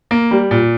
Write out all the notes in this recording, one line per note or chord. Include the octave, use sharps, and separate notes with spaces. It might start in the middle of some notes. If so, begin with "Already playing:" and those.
A#3
G3
A#2